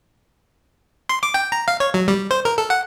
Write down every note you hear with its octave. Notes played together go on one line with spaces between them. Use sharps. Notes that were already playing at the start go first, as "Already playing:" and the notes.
C6
D6
G5
A#5
F5
C#5
F#3
G3
C5
A#4
A4
F#5